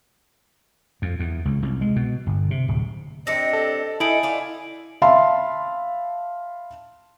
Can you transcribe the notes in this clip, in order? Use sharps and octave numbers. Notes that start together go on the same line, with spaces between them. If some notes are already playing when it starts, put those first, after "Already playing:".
F2
E2
C#2
C2
G#3
B2
G1
C3
D1
C4 D4 G4 D#5 A#6 C#7
A4
D#4 E4 A4 G#5 D7 F#7
F4 D5
E5 F5 A5 B5 C6